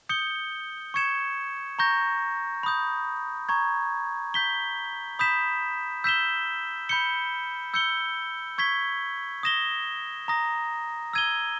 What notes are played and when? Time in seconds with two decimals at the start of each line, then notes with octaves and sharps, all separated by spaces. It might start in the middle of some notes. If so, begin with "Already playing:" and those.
0.09 D#6 G6 C#7 G7
0.94 C#6 G#6 C#7 E7
1.79 A#5 C#6 G6 A#6
2.63 B5 D#6 G6
3.49 A#5 C#6 G#6
4.34 G6 B6 G7
5.19 B5 D#6 G6 B6 E7
6.04 E6 G6 B6 E7 G7
6.89 B5 G6 C#7 G7
7.74 E6 G6 C#7 G7
8.58 C#6 G#6 B6 G7
9.43 D#6 A#6 E7 G7
10.28 A#5 D#6 A#6
11.13 E6 G#6 D#7 G7